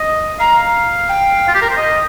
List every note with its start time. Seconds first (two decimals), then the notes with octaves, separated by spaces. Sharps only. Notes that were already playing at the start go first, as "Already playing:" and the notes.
Already playing: D#5
0.39 F5 A#5
1.09 G5
1.48 F4
1.54 G4
1.62 A#4
1.70 C5
1.77 D#5